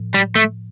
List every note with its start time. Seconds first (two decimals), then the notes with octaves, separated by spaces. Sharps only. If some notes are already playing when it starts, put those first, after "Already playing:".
Already playing: A2 F3
0.14 G3
0.35 A3